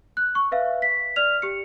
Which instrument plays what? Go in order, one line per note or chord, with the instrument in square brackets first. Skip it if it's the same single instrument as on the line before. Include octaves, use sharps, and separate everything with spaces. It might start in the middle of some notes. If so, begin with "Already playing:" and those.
[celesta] F#6
C#6
B4 E5 F5
B6
D5 F6 F7
G4 C#7